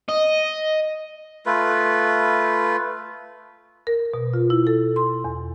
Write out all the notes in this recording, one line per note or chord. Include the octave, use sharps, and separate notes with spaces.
D#5
A3 F4 B4
A#4
B2
F4
E4
A4
C6
E2